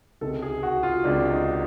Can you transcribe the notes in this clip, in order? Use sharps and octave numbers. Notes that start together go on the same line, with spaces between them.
C#2 C3 D#3 G#3 A4
G#4
F#4
F4
C#2 C3 D#3 G#3 D4
D#4